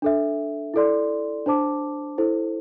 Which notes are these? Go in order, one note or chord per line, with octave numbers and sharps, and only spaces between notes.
D4 A4 E5
E4 A4 D5 C6
D4 C5 A5 D6
E4 A4 C5